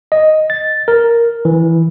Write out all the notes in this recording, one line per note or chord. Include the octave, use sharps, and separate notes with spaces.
D#5
A6
A#4
E3